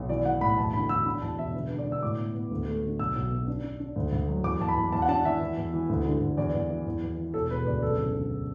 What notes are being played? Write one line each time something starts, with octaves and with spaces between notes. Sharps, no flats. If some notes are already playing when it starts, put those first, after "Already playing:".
Already playing: B1
E3 D5
E3 F#5
A2 B5
E2 A5
D3 B5
E2 E6
D4 B5
E2 A5
E1 E5
D3 B4
D3
D5
D3
E6
A2 D6
B3
B3
D2
A3
D3
B1 E6
B1
B2
D4
D4
D4
D2
D2
F#3
E2 D6
E2 A5
B5
E2
E2 A5
F#5
D4 A5
E3 E5
E3
E2
E3
D2
D3
D2
E2 D5
E2
E3
E2
E2
E3
E1 A4
E1 B4
D2 D5
F#1 A4
F#1
D3